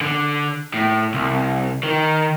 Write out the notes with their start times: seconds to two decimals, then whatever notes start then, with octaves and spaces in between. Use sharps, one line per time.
0.01 D3
0.74 A2
1.14 C2
1.83 D#3